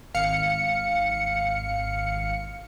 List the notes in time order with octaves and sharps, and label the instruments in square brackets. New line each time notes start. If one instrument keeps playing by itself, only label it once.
[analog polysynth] G#1 F5 C#7